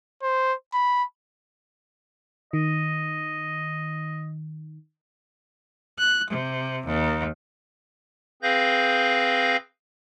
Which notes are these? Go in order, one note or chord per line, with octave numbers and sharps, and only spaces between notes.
C5
B5
D#3 D#5
F#6
C3
D#2
C4 G#4 B4 F5 G6 A#6